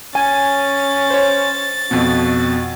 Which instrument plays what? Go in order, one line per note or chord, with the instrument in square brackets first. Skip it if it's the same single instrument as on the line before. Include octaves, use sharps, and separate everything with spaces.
[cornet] C#4 [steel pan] G#5 [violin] A6
[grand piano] C5 C#5
[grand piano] F2 B2 [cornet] F#4